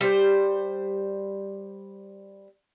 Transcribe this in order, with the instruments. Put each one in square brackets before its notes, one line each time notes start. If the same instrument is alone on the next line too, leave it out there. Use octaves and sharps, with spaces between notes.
[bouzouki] G3 C5